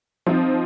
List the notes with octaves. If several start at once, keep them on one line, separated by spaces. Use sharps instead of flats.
F3 C4 D#4